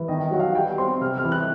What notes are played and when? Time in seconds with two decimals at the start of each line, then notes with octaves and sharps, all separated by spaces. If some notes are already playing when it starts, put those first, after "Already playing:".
Already playing: E3
0.08 D#3 D#5
0.24 D#5
0.31 F#3 F#5
0.39 F5
0.55 G3 G5
0.78 C4 C6
1.01 C3 F6
1.17 F6
1.24 E3
1.32 F#6